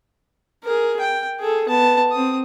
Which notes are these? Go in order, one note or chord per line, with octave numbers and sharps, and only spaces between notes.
G#4 A#4
G5
G#4 A4
B3 A5
C4 D#6